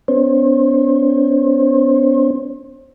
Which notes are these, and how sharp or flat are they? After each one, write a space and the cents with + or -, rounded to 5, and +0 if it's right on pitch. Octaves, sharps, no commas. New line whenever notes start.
B3 +35 D4 -40 C5 +40